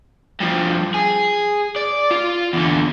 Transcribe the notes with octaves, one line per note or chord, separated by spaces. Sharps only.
G2 F3
G#4
D5
F4
E2 D3